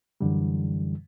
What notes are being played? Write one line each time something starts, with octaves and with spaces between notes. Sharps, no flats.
F#2 D3 E3 G3